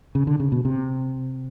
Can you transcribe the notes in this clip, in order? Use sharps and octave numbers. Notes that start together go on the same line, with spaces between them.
C#3
D3
C#3
B2
C3